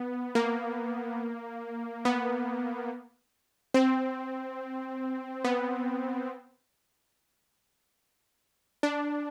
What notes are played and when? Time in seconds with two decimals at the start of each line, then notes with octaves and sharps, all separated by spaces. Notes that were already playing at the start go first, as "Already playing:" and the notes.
Already playing: B3
0.35 A#3
2.05 B3
3.74 C4
5.44 B3
8.83 D4